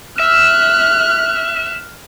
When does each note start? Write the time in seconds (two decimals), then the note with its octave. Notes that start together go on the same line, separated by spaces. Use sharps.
0.20 E5 F6 F#6